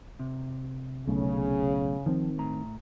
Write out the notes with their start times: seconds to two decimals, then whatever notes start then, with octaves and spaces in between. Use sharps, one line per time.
0.20 C3
1.07 B1 C#3 A3
2.06 D#3 F3 C4
2.38 A2 A#5